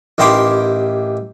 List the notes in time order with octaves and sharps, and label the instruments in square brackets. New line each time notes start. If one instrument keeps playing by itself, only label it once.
[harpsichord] A1 D#3 E4 G4 C6 D6